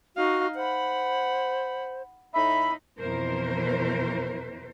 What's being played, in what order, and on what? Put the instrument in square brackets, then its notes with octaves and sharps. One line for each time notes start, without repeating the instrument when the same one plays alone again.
[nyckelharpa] D#4 F5 [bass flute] F#4
[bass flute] C5 [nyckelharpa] F#5 B5
[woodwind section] A2 E5 B5 [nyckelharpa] D#4
[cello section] F2 B2 E3 A#4 C5